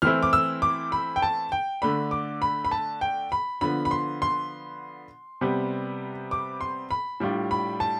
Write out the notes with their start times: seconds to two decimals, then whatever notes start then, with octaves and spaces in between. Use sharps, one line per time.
0.02 E3 A3 C4 E4 F6
0.23 D6
0.33 E6
0.62 D6
0.92 B5
1.16 G5
1.22 A5
1.52 G5
1.82 D3 A3 D4 B5
2.11 D6
2.42 B5
2.65 B5
2.71 A5
3.01 G5
3.32 B5
3.61 D3 F3 B3 B5
3.85 B5
3.91 C6
4.22 C6
5.41 C3 G3 B3
6.31 D6
6.61 C6
6.91 B5
7.20 A2 G3 D4 F4
7.51 B5
7.80 A5